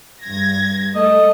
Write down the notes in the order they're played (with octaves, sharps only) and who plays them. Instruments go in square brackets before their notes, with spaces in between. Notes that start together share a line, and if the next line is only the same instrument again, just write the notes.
[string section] G2 G#6 A#6
[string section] A3 A4 [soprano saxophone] D#5